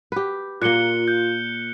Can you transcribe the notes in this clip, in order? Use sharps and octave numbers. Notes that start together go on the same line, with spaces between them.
G4 B4
A#2 A#3 F4 F#6 C#7 G7
F#6 G6